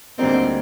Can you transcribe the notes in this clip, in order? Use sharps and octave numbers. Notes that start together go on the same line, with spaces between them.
D2 D3 G3 A#3 C4 D#4